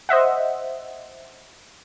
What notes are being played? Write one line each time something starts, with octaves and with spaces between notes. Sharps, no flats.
C5 D#5 E5 F#5